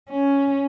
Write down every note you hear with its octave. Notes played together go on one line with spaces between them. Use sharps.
C#4